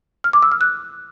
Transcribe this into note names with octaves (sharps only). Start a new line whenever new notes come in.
F6
D6
E6
F6
F#6